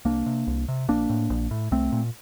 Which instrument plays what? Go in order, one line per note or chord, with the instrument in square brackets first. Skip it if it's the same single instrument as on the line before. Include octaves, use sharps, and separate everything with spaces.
[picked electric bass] C2 A#3 D4
C3
C2
C3
A#1 A#3 D4
A2
A#1
A2
C2 A3 C4
A#2